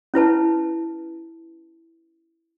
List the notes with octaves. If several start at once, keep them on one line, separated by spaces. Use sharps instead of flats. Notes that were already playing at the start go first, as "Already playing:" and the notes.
C#4 E4 B4 A5